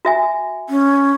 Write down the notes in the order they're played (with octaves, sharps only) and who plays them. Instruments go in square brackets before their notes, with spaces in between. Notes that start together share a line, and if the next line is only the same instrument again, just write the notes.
[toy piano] F#4 E5 G#5
[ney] C#4